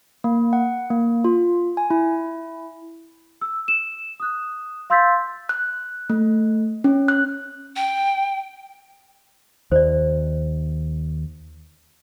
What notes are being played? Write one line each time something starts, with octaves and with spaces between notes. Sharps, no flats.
A#3
F#5
A#3
F4
G#5
E4
E6
E7
D#6 F#6
F5 C6 E6 G6 A6 B6
F#6
A3
C#4
F#6
G5
D#2 C5 D5